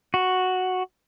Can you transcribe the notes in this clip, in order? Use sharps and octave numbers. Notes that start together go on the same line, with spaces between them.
F#4